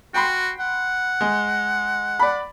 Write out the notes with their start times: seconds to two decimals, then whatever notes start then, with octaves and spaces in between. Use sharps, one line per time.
0.14 F#4 G5 B5 C6
0.59 F#5
1.21 G#3
2.19 D5 B5